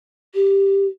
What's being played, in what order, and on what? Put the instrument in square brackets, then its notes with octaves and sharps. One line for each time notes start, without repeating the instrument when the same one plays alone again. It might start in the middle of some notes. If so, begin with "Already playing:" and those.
[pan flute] G4